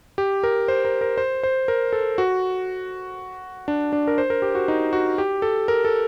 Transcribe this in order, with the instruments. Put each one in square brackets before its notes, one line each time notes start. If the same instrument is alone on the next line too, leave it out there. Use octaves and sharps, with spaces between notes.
[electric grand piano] G4
A#4
C5
A#4
A#4
C5
C5
A#4
A4
F#4
D4
D4
A#4
C5
A#4
G4
F#4
D#4
F#4
G4
A4
A#4
A4